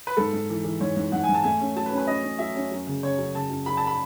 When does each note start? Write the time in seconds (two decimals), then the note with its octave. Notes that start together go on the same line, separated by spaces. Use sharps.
0.07 B4
0.17 G#2 A4
0.33 G#2
0.50 E3
0.64 E3
0.80 G#2 C#5
0.96 G#2
1.12 G#2 F#5
1.24 G#5
1.29 G#2
1.34 A5
1.44 A3 G#5
1.61 C#4
1.76 F#3 A5
1.86 B4
1.92 C#4
1.98 B4
2.07 C#4 D#5
2.23 C#4
2.39 F#3 E5
2.56 C#4
2.71 F#2
2.87 C#3
3.03 C#3 C#5
3.18 F#2
3.35 C#3 A5
3.50 F#2
3.66 F#2 B5
3.77 A5
3.87 B5